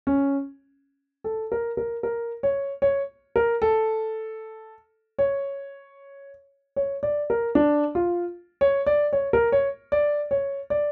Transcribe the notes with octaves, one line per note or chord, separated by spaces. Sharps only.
C#4
A4
A#4
A#4
A#4
C#5
C#5
A#4
A4
C#5
C#5
D5
A#4
D4
F4
C#5
D5
C#5
A#4
C#5
D5
C#5
D5